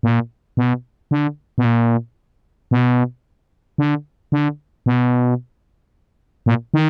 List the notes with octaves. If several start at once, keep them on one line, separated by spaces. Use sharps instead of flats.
A#2
B2
D3
B2
A#2
B2
D3
D3
B2
A#2
D#3